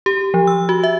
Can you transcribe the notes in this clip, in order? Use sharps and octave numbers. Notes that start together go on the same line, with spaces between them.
G4
F3
E6
F#4
E5